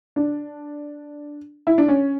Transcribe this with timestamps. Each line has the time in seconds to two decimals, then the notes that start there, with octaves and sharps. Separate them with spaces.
0.16 D4
1.67 E4
1.78 D4
1.88 C#4